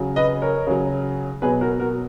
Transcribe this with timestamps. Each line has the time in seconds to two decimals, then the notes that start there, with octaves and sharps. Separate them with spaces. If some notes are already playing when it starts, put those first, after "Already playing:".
Already playing: C#3 F#3
0.16 B4 D#5
0.42 A#4 C#5
0.67 C#3 F#3
1.42 B2 F#3 G#4 B4
1.61 F#4 A#4
1.80 F#4 A#4